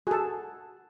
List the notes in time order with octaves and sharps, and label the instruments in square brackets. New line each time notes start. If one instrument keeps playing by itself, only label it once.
[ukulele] F#4 [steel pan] G#4 A4